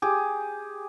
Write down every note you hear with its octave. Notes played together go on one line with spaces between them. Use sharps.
G4 G#4